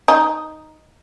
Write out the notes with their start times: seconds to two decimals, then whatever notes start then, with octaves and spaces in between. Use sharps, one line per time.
0.08 D#4